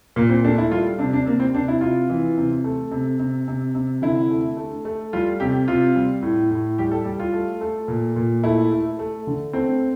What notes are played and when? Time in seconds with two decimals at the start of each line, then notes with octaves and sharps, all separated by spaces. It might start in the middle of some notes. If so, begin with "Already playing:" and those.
0.16 A#2 A#3
0.29 C4
0.44 A3 D4
0.58 E4
0.71 G3 F4
0.99 C3 D4
1.13 D4
1.26 C3 A#3
1.40 C4
1.55 C3 D4
1.68 E4
1.81 C3 F4
2.10 E3
2.37 C3
2.64 A3
2.91 C3
3.20 C3
3.48 C3
3.75 C3
4.02 D3 E4
4.30 A3
4.57 A3
4.85 A3
5.13 G3 F4
5.40 C3 G4
5.68 C3 F4
5.96 G3
6.22 A2
6.50 A2
6.78 G3 G4
6.91 A4
7.05 G3 G4
7.20 F4
7.33 A3
7.61 A3
7.88 A#2
8.16 A#2
8.43 A3 E4
8.72 A3
8.99 A3
9.27 D3
9.53 A3 C4